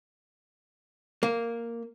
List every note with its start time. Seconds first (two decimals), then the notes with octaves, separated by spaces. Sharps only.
1.23 A#3